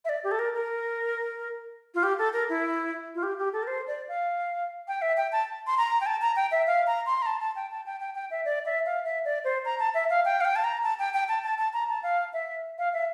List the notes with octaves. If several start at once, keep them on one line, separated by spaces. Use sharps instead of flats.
E5
D5
G4
A4
A#4
A#4
F4
G4
A4
A#4
E4
F4
G4
G4
A4
A#4
C5
D5
F5
G5
E5
G5
A5
C6
A#5
G5
A5
A#5
G5
E5
F5
A#5
C6
A#5
A5
A5
G5
A5
G5
G5
G5
E5
D5
E5
F5
E5
D5
C5
A#5
A5
E5
F5
G5
F5
G5
A5
A#5
A5
G5
G5
A5
A5
A5
A#5
A5
F5
E5
F5
E5